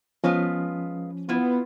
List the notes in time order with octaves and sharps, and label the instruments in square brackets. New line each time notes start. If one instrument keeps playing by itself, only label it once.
[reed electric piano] F3 C#4 [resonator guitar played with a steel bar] G#3 B3 F4
[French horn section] B3 [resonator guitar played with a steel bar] E4 F4